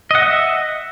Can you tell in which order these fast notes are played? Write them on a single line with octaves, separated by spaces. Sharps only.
D#5 F#5 E5